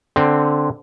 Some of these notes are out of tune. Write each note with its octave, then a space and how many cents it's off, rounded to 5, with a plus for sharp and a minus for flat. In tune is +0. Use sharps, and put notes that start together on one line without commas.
D3 +0 C4 +0